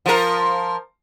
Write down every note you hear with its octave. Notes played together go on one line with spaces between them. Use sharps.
F3 A#4